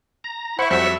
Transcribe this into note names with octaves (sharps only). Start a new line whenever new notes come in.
A#5
E4 C5 E5 F#5 B5 C#6
F2 F#3 G3 E5